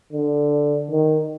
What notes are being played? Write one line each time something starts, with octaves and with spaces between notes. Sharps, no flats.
D3
D#3